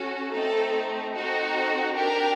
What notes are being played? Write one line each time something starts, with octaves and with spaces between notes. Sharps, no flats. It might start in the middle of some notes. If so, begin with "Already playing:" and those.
Already playing: C#4 F#4 A4
A3 C4 D#4 A4
C4 D#4 F#4 A4
D4 G4 A#4